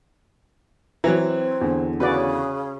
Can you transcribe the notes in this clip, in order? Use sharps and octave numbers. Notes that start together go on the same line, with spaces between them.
E3 F#3 C4 A#5
E2 D3
C#3 C#4 F#4 B4 D5